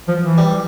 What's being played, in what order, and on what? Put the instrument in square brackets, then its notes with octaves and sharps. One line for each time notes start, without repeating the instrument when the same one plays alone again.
[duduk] F3
E3
[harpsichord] G3